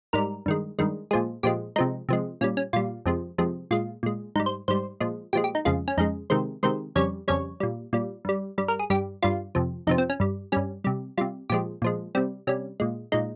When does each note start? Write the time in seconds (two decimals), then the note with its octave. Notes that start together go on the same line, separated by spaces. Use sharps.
0.13 G#2 G3 A#4
0.46 G2 D#3 G#3
0.79 G2 D#3 G#3
1.11 A#2 F3 G#3 G#4
1.43 A#2 F3 G#3 G4
1.76 C3 F3 G#3 D#4
2.09 C3 F3 G#3
2.41 A#2 C#4
2.44 G3
2.57 C#4
2.73 A#2 G3 F4
3.06 F2 C3 F3 G#3
3.38 F2 C3 F3 G#3
3.71 A#2 G#3 F4
4.03 A#2 G#3
4.36 G#2 G3 D#4
4.46 C5
4.68 G#2 G3 C5
5.00 A#2 F3 G#3
5.33 A#2 F3 G#3 G4
5.44 G4
5.55 D#4
5.65 F2 C#3 G#3 F4
5.88 C#4
5.98 F2 C#3 G#3 D#4
6.30 C3 D#3 G#3 C5
6.63 C3 D#3 G#3 C5
6.95 F2 C#3 G3 C#5
7.28 F2 C#3 G3 C#5
7.60 A#2 G3
7.93 A#2 G3
8.25 G2 G3
8.58 G2 G3
8.68 A#4
8.79 G#4
8.90 G2 G3 G4
9.23 G2 G3 F4
9.55 F2 C3 F3
9.87 F2 C3 F3 D#4
9.98 C4
10.10 C#4
10.20 G2 G3
10.52 G2 G3 C#4
10.84 C3 G3
11.18 C3 G3 F4
11.50 A#2 F3 G#3 G4
11.82 A#2 F3 G#3
12.15 C3 G3 C4
12.47 C3 G3 C#4
12.80 A#2 G#3
13.12 A#2 G#3 D#4